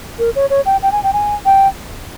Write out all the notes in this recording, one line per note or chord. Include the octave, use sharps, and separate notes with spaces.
A#4
C#5
C#5
G5
G5
G#5
G5
G#5
G5